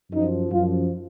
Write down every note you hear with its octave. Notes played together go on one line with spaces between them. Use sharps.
F#2 F3 D#4
F#2 F3 F4